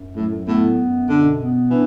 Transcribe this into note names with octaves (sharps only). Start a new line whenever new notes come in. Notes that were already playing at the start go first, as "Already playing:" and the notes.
Already playing: F#2
A2 F#3
A2 B3
F#2
B2 D3
B3
E3 D4